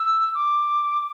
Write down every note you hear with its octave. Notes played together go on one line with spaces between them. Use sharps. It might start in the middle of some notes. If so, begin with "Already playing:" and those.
Already playing: E6
D6